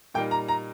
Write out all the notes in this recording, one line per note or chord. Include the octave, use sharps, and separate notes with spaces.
A#2 G3 A#3 D#4 G5
A#5
A#5